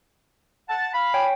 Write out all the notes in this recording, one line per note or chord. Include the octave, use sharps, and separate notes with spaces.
F#5 A5
F5 B5
C#5 G5 G#5